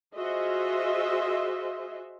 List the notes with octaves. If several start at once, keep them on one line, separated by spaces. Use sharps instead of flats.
F4 F#4 G#4 C5 D#5 E5